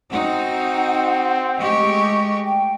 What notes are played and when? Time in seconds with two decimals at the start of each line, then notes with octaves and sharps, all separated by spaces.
0.12 C4 D#4 F#4 F#5
1.57 G#3 A3 G4 D#5 C#6
2.46 G5